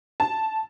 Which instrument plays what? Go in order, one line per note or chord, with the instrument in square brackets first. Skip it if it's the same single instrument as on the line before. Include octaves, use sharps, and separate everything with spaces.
[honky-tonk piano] A5